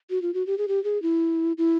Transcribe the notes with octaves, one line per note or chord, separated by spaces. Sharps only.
F#4
F4
F#4
G4
G#4
G4
G#4
E4
E4